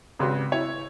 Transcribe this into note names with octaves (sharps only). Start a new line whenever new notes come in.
G#1 C#3 G4 B4 C6
E4 C#5